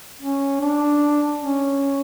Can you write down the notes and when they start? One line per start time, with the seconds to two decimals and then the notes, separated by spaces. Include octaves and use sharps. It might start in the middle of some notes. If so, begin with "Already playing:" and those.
0.21 C#4
0.61 D4
1.41 C#4